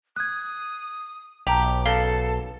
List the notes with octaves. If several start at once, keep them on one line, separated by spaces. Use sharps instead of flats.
D#6 F#6 G#6
B1 G4 A5 A#5 F7
C#3 A4 F5 C7 G7